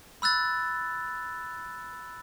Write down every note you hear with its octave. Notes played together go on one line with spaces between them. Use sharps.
B5 E6 F#6 A6